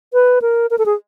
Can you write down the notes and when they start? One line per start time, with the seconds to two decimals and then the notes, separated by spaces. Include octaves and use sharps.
0.13 B4
0.42 A#4
0.71 A#4
0.78 A4
0.86 G#4